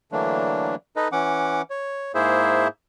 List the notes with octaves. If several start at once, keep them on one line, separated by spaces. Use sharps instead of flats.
D3 E3 F#3 A3 A#3 D4
D#4 A4 B4 D#5
E3 C#4 F#5 D6
C#5
G#2 A#3 E4 G#4 C5 E5